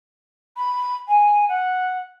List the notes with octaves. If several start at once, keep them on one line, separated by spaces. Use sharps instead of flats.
B5
G#5
F#5